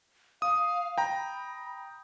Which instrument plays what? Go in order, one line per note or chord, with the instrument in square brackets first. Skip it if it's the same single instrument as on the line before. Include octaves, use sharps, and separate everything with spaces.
[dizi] F5 [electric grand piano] D#6
[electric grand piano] G5 A#5 [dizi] B5